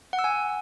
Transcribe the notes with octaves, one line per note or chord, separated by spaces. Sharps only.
F#5
E6
G#5